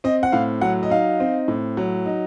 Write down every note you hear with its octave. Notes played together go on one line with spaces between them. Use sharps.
C4 D#5
F#5
A2 F5
F#3 F#5
D#5
D#4 F5
C4
A2
F#3
D#4